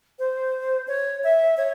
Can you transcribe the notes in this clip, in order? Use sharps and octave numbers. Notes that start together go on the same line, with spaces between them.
C5
C#5
E5
C#5